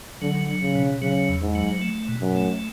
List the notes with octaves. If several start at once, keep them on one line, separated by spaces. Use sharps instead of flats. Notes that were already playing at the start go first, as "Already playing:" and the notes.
D3 F#3
F#3
C#3
B2
C#3 F#3
E2
G#2
F#3
A3
B2
F#2
A3